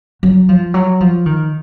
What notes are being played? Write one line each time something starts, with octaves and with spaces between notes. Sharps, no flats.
F#3
F3
F#3
F3
D#3